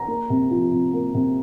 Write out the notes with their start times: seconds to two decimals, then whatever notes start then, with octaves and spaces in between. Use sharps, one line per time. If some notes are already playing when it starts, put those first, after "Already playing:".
Already playing: A#5
0.08 A#3
0.30 C3
0.51 F3
0.72 C3
0.93 A#3
1.15 C3